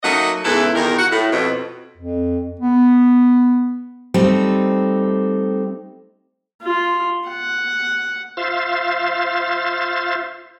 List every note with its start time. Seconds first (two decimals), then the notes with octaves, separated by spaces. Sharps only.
0.03 F#3 A3 A#3 D#4 D#5 F#5
0.44 E2 G#2 C#3 E3 E4 A4
0.75 E2 A#2 D#3 A#4
0.98 F#4 F#5
1.12 A2
1.32 F2 B2
1.98 F2
2.60 B3
4.14 G3 A3 C4 D#4 A4
6.62 F4
7.28 F#5
8.37 F4 C5 E5 F5 A6